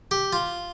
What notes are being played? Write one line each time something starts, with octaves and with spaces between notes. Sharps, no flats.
G4
F4